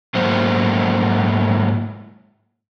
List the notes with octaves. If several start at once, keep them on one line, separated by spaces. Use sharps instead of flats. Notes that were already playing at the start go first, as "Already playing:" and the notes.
G#2 F#3 A3 A#3 E4 C5